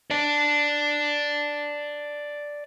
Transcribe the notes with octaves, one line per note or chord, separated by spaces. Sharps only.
D5 A5